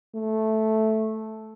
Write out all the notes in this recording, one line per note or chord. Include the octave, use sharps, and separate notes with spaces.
A3